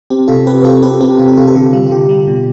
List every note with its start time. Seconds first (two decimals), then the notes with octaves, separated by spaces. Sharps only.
0.10 C4 G4
0.28 C3 F4 A4
0.46 C4 G4 B4
0.61 B4
0.64 C4 F4 A4
0.82 C4 G4 B4
0.93 A4
1.01 C4 G4
1.18 C3 F4
1.28 G4
1.37 C3 F4 A4
1.47 A4
1.55 D3 G4
1.73 G3 F4
1.87 F4
1.91 D3 G4
2.09 G3
2.28 B2